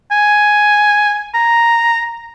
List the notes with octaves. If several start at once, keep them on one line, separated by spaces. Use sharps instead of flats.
G#5
A#5